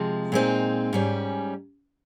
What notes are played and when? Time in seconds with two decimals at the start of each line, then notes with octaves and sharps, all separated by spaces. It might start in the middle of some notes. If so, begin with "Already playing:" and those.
Already playing: C3 F3 G#3
0.32 A#2 G#3 C4 D#4
0.93 G#2 G3 C#4